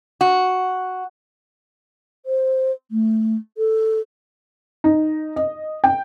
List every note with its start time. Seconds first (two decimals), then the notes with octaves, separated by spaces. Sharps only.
0.21 F#4
2.26 C5
2.91 A3
3.58 A4
4.84 D#4
5.36 D#5
5.84 G5